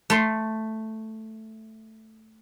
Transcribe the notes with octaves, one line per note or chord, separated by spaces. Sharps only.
A3 C6